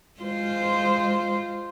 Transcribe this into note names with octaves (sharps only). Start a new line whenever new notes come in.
G#3 F4 C5